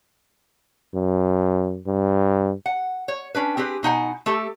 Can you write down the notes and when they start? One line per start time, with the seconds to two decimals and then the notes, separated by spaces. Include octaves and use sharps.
0.95 F#2
1.87 G2
2.66 F#5
3.08 C#5
3.35 C#4 D4 B4
3.57 C4 G4 G#4 B4
3.83 B2 D#4 F#5 G#5
4.26 A3 G4 A4